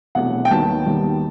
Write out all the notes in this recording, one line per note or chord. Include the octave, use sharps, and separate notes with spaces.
E1 E2 C3 F#3 A3 F#5
G5
D#2 D#3 F#3 B3 D#4 A5
D#2 D#3 G3 B3 D#4